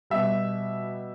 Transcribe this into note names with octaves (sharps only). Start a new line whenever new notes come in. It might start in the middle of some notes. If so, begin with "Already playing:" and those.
B2 G3 E5